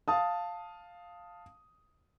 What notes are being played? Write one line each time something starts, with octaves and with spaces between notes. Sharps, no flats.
F5 A5 D#6